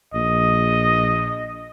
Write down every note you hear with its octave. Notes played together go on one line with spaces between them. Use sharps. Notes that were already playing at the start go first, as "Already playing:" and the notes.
A#1 D#5